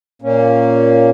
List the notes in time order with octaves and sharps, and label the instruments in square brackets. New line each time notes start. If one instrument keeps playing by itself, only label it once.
[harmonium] A#2 A#3 C#4